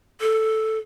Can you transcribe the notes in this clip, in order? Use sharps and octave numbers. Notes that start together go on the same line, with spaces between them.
A4